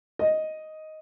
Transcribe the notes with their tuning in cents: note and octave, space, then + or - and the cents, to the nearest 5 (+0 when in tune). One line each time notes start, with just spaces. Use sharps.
D#5 +5